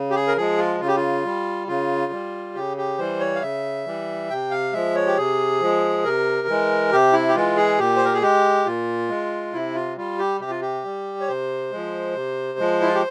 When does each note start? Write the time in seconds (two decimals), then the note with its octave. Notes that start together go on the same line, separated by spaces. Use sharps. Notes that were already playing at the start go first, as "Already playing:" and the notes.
Already playing: C#3
0.10 G4
0.16 G#4
0.28 A#4
0.36 F3 G#3 G#4
0.58 F4
0.80 C#3 F4
0.88 G4
0.96 F4
1.25 G3
1.68 C#3 F4
2.12 G3
2.55 C#3 G4
2.77 G4
2.98 E3 G3 C5
3.20 C#5
3.36 F5
3.42 C#3 E5
3.86 E3 G3
4.30 C3 G5
4.51 F5
4.73 F3 G#3 E5
4.95 C#5
5.07 G4
5.17 C3 G#4
5.61 F3 G#3
6.04 C3 A#4
6.48 E3 G#3
6.92 C3 G4
7.13 E4
7.29 G4
7.35 E3 G#3 F4
7.57 G#4
7.78 A#2 G4
7.96 C5
8.05 A#4
8.14 G#4
8.22 G#3 G4
8.66 A#2 F4
9.09 G#3
9.53 C3 E4
9.75 F4
9.97 G3 F4
10.19 G4
10.40 C3 G4
10.50 F4
10.62 G4
10.84 G3
11.21 C#5
11.28 C3 C5
11.72 F3 G#3
12.15 C3
12.59 F3 G#3
12.81 E4
12.88 F4
12.94 G4